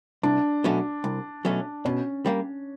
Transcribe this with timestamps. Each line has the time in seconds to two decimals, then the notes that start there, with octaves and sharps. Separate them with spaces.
0.23 C2 D4
0.64 B2 F#3 A3 C#4
1.04 C2
1.45 B2 F#3 A3 C#4
1.85 B2 C#4
2.26 G3 A#3